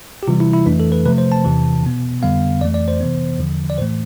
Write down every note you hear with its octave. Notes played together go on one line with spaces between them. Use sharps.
G4
C3 E3 G3 F4
E4
E4
F2 E3 A3 D4
A4
B4
C3 F3 A3 B4
C5
A5
E2 C3 E3
B2 B3
F2 D3 G3 B3 F5
F2 E3 A3 D5
D5
C5
C3 E3 B3
E2 D3 F3
D5
A2 E3 A3 C5